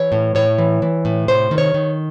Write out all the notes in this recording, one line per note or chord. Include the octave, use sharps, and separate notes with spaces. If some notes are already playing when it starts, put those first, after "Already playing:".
Already playing: E3 C#5
A2
A2 C#5
E3
E3
A2
C3 C5
D#3
C#5
D#3